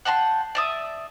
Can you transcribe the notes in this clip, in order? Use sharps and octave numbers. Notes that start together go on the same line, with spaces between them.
F#5 G5 A5 C6
D5 E5 D#6